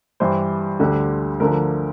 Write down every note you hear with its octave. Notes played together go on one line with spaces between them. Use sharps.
G2 E3 G3 C5
D2 D3 G3
D2 D3 F3 A#4